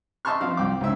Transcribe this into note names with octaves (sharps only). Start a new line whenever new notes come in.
D#5 E5 A5 C6 C#6 F6
F3 C4 C5 F5
C2 G5 D6
C#2 G#2 C4 C#4 E5 E6